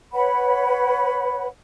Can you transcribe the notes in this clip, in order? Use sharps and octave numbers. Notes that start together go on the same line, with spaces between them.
B4 C#5 F#5 B5